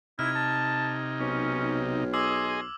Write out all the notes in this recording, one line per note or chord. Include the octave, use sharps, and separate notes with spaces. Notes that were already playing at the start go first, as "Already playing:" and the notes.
C3 D#4 E4 F6 G#6
A5
B1 C#4
G#4 D#5 G#5 C6 D6 E6 F#7